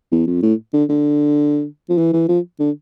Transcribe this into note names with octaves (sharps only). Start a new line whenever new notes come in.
E2
F2
A2
D3
D3
F3
E3
E3
F3
D3